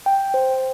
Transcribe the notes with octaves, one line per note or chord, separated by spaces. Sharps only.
G5
C5